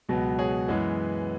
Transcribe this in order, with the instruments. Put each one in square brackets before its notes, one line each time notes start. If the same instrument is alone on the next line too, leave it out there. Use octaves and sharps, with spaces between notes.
[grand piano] C#2 B2 F#3 B3
G#4 C#5
F#2 E3 G#3 B3